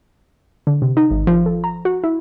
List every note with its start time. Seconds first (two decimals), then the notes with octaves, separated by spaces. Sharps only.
0.67 D3
0.82 C3
0.97 D#4
1.11 G#1
1.27 F3
1.46 A4
1.64 A#5
1.85 F#4
2.04 E4